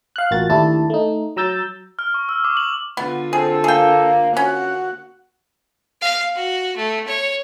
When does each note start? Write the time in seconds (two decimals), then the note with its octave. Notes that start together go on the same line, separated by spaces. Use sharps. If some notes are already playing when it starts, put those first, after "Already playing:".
0.16 F5 F#6
0.31 A1 A#3 F4 F#4 A6
0.50 D#2 A3 D4 E4 G4 A5
0.90 A3 D#4
1.36 F#3 A#5 E6 G6 A6
1.99 F6
2.14 C#6
2.29 E6
2.44 D6
2.57 F#7
2.97 D3 B3 F4
3.33 C4 G#4 A4
3.64 A#3 G#4 G5
4.37 C#4 F#4 F#5
6.01 F5
6.35 F#4
6.76 A3
7.08 C#5